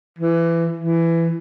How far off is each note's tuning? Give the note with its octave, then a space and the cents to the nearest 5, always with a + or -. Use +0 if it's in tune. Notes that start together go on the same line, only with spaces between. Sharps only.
E3 +20
E3 +15